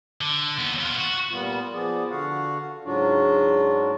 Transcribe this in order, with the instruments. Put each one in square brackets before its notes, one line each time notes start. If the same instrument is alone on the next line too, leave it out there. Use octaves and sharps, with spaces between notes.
[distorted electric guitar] D3
D#2 B3
B3 F4
F#4
[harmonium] A#2 G3 B3 F4
F3 B3 G#4 D5
D3 F#4 F5 F#5
G#2 C#3 F#3 D4 F4 F#4